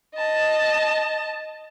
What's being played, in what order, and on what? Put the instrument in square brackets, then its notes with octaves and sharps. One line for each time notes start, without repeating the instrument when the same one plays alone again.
[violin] D#5 A5